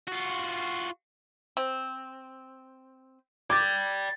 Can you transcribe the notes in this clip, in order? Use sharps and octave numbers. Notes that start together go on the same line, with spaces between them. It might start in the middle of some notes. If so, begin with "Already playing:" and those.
F4 F#4
C4
D5 G5 D6 G#6 A6